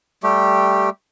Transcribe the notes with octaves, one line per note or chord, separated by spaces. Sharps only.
G3 A3 G4